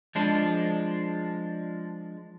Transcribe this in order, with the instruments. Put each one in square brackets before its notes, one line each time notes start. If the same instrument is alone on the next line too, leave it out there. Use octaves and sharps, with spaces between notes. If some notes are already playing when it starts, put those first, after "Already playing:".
[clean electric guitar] F3 G#3 D4